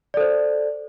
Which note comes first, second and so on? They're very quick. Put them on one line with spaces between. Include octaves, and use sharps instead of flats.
D5 A4 C5